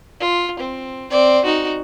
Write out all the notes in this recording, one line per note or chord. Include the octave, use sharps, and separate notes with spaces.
F4
C4
C4 D5
D#4 F#4